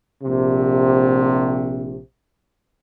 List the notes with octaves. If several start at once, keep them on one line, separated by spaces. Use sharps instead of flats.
A#1 C3